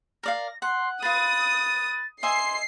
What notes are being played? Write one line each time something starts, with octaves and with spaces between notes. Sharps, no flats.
A#4 D5 F5 A#6
F#5 C6
F4 B4 D#6 A6
D#5 E5 G#5 C6 C7